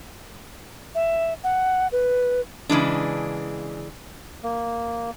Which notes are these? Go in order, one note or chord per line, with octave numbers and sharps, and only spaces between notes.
E5
F#5
B4
C#3 E3 G#3 D4
A#3